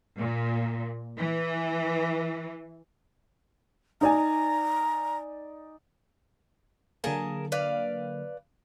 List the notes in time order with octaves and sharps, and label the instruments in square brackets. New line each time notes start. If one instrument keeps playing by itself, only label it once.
[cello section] A#2
E3
[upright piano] D#4 D5 G#5 [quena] A#5
[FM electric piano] D3 F#3 A#3 [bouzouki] G#4 A#4 A5
[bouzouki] B4 D5 F5